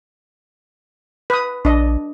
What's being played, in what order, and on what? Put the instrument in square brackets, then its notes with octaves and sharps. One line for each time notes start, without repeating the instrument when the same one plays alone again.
[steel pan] B4 D#6
[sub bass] A#1 [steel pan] D4 D#5